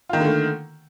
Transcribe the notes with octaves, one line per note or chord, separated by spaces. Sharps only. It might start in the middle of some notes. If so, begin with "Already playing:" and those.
D3 D#3 A3 A#3 F4